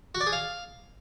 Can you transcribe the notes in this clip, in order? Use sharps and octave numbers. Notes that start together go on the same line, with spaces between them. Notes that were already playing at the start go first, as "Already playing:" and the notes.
F#4
D5
G#4
F5